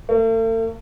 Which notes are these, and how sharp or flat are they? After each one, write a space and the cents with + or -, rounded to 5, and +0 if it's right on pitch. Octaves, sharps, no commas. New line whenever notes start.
A3 +45